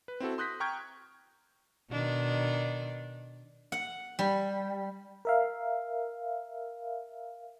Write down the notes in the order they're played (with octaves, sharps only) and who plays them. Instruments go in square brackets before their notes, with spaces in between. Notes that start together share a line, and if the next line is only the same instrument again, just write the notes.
[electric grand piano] B4
C4 E4 F#4 A4
C6 D#6 F#6 G6 A#6 B6
G5 A#5 C#6 F6 G6 G#6
[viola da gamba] B2 D#3 D4
[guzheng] F#5
G3
[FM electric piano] A#4 E5 F5